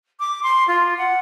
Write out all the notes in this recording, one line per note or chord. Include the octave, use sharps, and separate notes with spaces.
D6
C6
F4
F#5